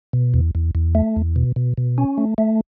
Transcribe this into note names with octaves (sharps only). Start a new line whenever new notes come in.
B2
E2
E2
E2
A3
E2
B2
B2
B2
C#4
A3
A3